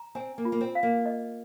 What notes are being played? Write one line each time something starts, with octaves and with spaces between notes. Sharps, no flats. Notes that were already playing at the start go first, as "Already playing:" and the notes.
Already playing: A#5
C4 G#5
A#3
F4
A#3
C4
F5
A#3
D#5